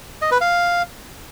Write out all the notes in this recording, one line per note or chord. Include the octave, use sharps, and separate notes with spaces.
D#5
B4
F5